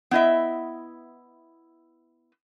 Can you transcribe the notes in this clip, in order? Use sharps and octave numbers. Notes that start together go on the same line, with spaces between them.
B3 E4 D#5 E5